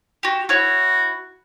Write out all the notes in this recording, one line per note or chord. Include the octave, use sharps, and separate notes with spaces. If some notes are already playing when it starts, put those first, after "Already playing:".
F#4 G4
E4 F#4 C#5